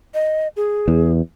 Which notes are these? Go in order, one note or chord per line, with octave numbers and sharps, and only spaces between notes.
D#5
G#4
E2